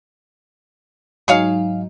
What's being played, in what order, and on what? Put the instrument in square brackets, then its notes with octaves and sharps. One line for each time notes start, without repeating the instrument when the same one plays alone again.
[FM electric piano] G#2 F#3 D#4 [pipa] G#4 C#5 F5